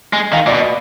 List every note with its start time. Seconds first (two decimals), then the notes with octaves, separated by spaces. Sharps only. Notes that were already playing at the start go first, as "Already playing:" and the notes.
0.13 G#3
0.33 D#3 F5
0.47 A#2 D5
0.53 B2
0.60 D#5